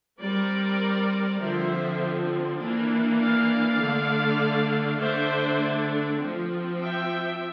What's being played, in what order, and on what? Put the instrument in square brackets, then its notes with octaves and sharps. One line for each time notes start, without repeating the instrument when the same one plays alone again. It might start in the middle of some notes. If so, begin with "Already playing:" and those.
[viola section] G3 C4 A#4 D5
D3 F3 C4 C5 E5
E3 A#3 D4
D5 F5
D3 A3 D4
D3 A3 D4 C5 E5
F3 C4
E5 G5